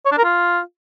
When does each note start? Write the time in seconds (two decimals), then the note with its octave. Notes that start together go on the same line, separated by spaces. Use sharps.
0.06 C#5
0.12 D4
0.18 A#4
0.24 F4